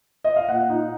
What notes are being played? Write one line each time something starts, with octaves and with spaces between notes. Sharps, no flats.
D#5
F5
A#2 F#5
D#4